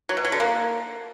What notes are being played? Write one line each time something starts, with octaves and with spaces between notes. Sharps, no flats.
F#3
B2
F#3
D3
A#3